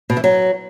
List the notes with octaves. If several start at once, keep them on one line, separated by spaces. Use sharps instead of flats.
B2
E3
F#3